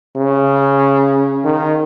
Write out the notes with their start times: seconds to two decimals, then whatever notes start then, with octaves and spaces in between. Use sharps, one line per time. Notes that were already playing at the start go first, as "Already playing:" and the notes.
0.16 C#3
1.44 D#3